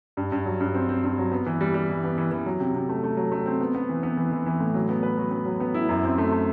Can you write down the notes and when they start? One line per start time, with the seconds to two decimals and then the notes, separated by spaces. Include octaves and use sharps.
0.17 G2
0.32 G2
0.46 F#3
0.60 G2
0.74 C4
0.89 C4
1.04 G2
1.18 F#3
1.32 B3
1.46 E3
1.61 G3
1.74 G3
1.89 E3
2.04 B3
2.18 E3
2.31 E3
2.46 F#3
2.60 C3
2.75 C3
2.89 A3
3.04 A3
3.17 F#3
3.32 A3
3.46 C4
3.61 B3
3.75 B3
3.89 E3
4.03 B3
4.17 E3
4.32 E3
4.46 E3
4.60 A2
4.74 F#3
4.89 B3
5.03 B4
5.17 F#3
5.31 B3
5.45 F#3
5.60 B3
5.74 E4
5.89 F#2
6.04 C4
6.18 A3
6.32 A3